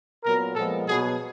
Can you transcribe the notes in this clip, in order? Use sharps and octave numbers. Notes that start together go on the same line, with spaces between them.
A#2 F#3 B3 A#4
A#2 F3 G#3 B3 A4
B2 F#3 B3 G#4